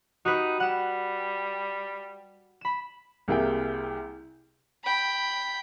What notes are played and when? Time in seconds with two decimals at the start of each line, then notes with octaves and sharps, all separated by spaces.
0.25 D#4 F#4 G4 B4
0.60 G3 F#5 E7
2.61 B5 E7
3.28 C2 C3 A#3 G#4 E5 G5
4.84 G5 B5